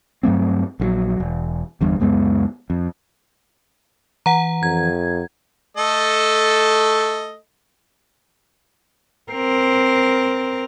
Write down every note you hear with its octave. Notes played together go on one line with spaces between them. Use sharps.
G2 F#3 A3 C4
A#1 D3 F#3
E1
G1 E2 G2
C#2 F#2 G#3 B3
F2
E3 F#5 A#5
F2 G#6
A3 A4 D#5
C4 A#4